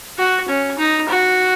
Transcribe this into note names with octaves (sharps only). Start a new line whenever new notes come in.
F#4
C#4
D#4
F#4